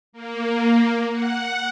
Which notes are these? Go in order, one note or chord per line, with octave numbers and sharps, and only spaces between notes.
A#3
F#5